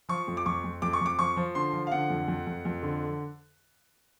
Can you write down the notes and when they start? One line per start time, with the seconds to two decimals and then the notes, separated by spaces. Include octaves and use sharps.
0.09 F3 C#6
0.28 F2
0.37 D6
0.46 F2 C#6
0.64 F2
0.82 F2 D6
0.93 C#6
1.01 F2 D6
1.19 F3 C#6
1.37 F3
1.55 D3 C6
1.73 F3
1.87 F5
1.91 D3 F#5
2.10 F2
2.28 F2
2.47 F2
2.65 F2
2.83 D3